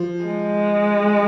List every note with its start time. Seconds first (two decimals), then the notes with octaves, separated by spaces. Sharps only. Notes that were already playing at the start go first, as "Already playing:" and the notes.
Already playing: F3
0.24 G#3